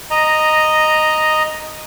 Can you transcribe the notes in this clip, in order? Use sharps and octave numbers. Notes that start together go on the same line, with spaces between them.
D#5 A#5